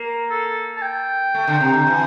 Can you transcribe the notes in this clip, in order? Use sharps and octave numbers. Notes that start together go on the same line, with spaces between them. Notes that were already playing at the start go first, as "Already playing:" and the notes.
Already playing: A#3
A4
A5
G5
A3
D3
C3
D3
E3